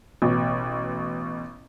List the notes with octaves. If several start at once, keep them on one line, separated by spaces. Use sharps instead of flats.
A1 B2